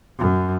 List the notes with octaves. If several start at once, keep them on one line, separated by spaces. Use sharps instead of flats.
F#2